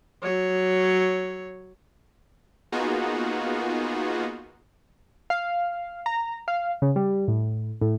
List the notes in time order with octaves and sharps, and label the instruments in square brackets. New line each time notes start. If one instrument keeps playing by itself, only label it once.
[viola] F#3 C#5
[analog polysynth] A#3 B3 D#4 F4 F#4 G#4
[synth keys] F5
A#5
F5
C#3
G3
A2
A2